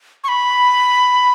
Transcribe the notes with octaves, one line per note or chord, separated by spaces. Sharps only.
C#6
B5